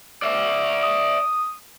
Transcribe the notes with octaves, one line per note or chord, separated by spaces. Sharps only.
D5 E5
D#6